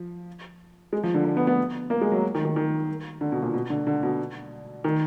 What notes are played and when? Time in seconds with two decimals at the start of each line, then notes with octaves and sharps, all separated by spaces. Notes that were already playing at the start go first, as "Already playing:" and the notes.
Already playing: F3
0.93 G#3
1.04 F3
1.14 D3
1.25 D3
1.37 B3
1.47 B3
1.90 A#3
2.01 G#3
2.12 F#3
2.35 D#3
2.45 D#3
2.56 D#3
3.21 D3
3.32 B2
3.42 A#2
3.54 B2
3.70 D3
3.87 D3
4.03 B2
4.84 D#3